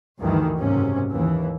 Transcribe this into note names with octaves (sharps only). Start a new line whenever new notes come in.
D2 G2 D#3 E3
F#1 G#2 C3 C#4
D#2 E3